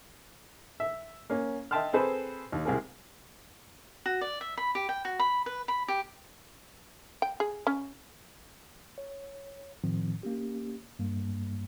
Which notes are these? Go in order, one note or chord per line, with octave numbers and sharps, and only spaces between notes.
E5
A#3 C#4
D#5 E5 G5 A5 C6 F6
C4 G#4 A4 B4 C5
D#2
C2 C4 G#4 A#4
F#4
D5
E5
B5
G4
G5
F#4
B5
B4
B5
G4
G5
G#4
C#4
C#5
A2 D#3 F3 C4
A#3 C#4 G4
G2 G3 A#3